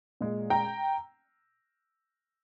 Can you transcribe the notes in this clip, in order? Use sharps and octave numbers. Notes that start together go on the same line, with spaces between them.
A#2 G#3
G5 A#5